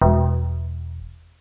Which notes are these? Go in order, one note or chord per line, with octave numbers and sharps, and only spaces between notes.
E1